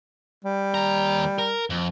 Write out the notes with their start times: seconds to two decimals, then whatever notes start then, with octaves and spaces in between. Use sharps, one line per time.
0.44 G3
0.74 D#2 A#5
1.39 A#4
1.70 F2